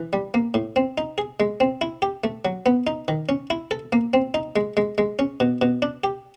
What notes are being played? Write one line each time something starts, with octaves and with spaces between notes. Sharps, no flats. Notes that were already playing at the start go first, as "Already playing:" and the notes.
Already playing: E3
G3
A#3
A2
C4
D#4
G#4
G#3
C4
E4
G4
A3
F#3
B3
D#4
D#3
C#4
E4
A4
A#3
C4
D#4
G#3
G#3
G#3
C#4
B2
B2
D4
G4